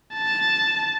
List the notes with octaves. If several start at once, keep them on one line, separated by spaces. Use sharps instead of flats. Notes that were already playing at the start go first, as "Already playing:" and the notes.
A5